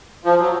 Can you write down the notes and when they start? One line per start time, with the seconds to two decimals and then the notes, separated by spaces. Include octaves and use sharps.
0.24 F3
0.39 F#3